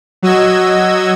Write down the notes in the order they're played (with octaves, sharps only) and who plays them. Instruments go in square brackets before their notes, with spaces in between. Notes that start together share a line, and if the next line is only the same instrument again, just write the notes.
[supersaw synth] F#3 F#4 D#5 E6 G#6